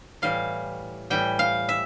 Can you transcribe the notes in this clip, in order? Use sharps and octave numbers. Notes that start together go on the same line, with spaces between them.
A2 E3 G3 F5
A2 E3 G3 G5
F5
E5